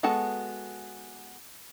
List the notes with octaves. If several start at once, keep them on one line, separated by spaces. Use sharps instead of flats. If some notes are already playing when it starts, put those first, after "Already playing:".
G#3 B3 F#4 A4 A5